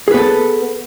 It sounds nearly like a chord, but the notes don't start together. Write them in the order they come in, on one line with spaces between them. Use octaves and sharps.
G#4 B4 B3 A4